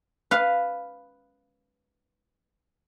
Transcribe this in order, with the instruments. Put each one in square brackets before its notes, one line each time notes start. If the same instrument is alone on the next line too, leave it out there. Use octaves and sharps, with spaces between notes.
[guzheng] B4 F5